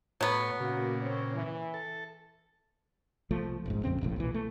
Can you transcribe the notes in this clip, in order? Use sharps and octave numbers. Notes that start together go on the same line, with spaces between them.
A2 F#3 B3 C#5
A#2 C#3 A#3 F#4
C4 C#5
E3
A4
C2 F3 A3
D#1 G#1 G#2
A#1 F2 C#3 C4
E1 A#1 A2
B1 A#2 E3
A3